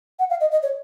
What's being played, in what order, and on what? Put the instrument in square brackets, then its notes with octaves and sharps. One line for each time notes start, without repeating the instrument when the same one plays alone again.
[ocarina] F#5
F5
D#5
D#5
C#5